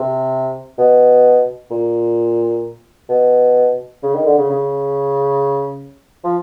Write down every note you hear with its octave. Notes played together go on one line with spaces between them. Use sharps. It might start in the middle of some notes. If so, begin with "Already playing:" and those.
Already playing: C3
B2
A#2
B2
C#3
D#3
D3
C#3
C#3
F3